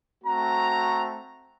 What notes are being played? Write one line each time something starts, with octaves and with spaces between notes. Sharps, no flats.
A3 C4 F#4 A#5